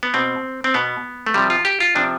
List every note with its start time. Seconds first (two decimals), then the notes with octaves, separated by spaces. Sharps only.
0.03 B3
0.14 B2 C4
0.64 C4
0.74 B2 B3
1.27 A3
1.34 C3 F3 G3
1.50 F4
1.65 G4
1.80 F4
1.95 C3 F3 D4